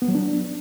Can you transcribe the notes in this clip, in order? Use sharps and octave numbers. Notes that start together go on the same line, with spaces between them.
B3
F#3
D4